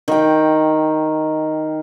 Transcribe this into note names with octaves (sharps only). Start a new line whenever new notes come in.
D#3 G5